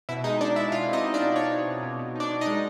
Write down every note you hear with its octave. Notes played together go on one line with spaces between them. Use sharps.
B2 E4 E5
G#3 D#4 D#5
D4 D#4 D5
G#3 E4 E5
B2 F4 F5
C4 D#4 D#5
C4
D4 D5
B2
D#4 C#5
D#4
B2
B2
B2
D4 D#4 D5
B2
D#4 D#5
G#3